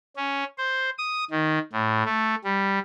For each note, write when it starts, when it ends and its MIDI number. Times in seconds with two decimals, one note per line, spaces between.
0.16 0.44 61
0.58 0.90 72
0.98 1.24 87
1.31 1.59 51
1.72 2.03 45
2.06 2.35 57
2.44 2.79 55